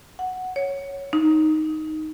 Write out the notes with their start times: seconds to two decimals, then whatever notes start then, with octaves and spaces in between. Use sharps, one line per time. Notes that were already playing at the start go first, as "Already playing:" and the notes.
0.19 F#5
0.56 C#5
1.13 D#4